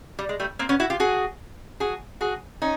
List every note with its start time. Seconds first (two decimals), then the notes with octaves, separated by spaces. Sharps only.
0.19 G3
0.29 G#3
0.40 G3 A3
0.59 A#3 C4
0.69 B3 C#4
0.80 E4 F#4
0.90 F4 G4
1.00 F#4 G#4
1.80 F#4 G#4
2.21 F#4 G#4
2.62 C#4 D#4